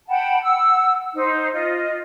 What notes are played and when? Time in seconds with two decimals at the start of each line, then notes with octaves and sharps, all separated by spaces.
0.08 F#5 G5 A5 B5
0.41 F#5 E6
1.15 D#4 C5
1.52 F4 D#5